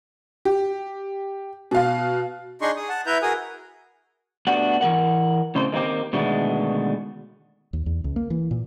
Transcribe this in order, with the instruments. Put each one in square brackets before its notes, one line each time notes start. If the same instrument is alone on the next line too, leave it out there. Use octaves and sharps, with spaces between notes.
[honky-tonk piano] G4
B2 F5
[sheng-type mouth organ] D4 D#4 G#4 D#5 C6 C#6
G#4 D#6
F#5 A5
E4 B4 E5 A#5 G6
F#4 G#4 A#4 G#5 D#6
[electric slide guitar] A3 B3 D4 F#4 G4 F#5
E3 G3 A#4 F#5
A2 C#3 C4 C5
D#3 G#3 A#3 C4 G4
B2 D3 D#3 G#3 A3 B3
[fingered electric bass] D#2
E2
C#2
A#3
E3
A#2